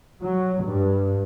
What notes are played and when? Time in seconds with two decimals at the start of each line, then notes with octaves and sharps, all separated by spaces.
0.24 F#3
0.65 G2